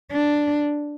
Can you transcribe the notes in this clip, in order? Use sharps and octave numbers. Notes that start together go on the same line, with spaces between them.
D4